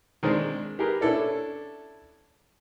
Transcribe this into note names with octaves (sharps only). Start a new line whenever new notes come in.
D#3 G#3 C4 D4
G4 G#4 A#4 B4
C#4 D4 E4 A4 D5